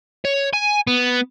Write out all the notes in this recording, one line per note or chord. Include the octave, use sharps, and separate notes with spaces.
C#5
G#5
B3